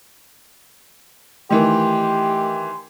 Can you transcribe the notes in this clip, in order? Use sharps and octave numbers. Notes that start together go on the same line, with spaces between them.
D#3 E3 A3 G4 A#4 C6